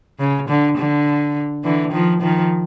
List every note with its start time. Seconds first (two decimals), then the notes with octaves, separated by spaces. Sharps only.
0.19 C#3
0.49 D3
0.77 D3
1.64 D3 E3
1.93 D#3 F3
2.22 D#3 F3